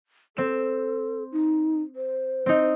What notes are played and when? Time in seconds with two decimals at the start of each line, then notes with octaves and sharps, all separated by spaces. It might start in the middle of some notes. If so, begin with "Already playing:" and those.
0.37 C4 A4 E7
1.32 D#4
1.96 C5
2.46 C4 D#4